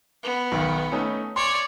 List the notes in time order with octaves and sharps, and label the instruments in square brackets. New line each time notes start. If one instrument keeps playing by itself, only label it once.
[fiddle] B3
[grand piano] B1 D#3
A3 C#4 D#4
[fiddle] C#5 D5 [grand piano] C6